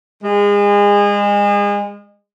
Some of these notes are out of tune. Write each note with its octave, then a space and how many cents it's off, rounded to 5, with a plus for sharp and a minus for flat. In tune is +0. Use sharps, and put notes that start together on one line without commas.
G#3 -30